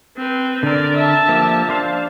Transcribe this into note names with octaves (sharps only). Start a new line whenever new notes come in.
C4 B4
D3 A#4 D5
E5 A5
F3 A#3 G4
D4 C5 F5